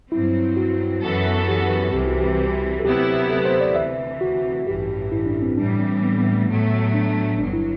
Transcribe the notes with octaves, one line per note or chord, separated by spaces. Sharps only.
G2 F#3 C4 E4
F#4
F#2 E3 B3 F#4 A4
G4
C2 C3 E3 G4
F#4
G4
A4
D2 C3 F#3 B3 E4 G4
A4
C5
D5
D2 C3 E3 E5
F#4
A1 G2 E3 G4
E4
D4
C4
A2 E3 G3 D4
C4
B3
B3
A3
A2 F#3 A3 B3
D4
G1 G2 F#3 D4
E4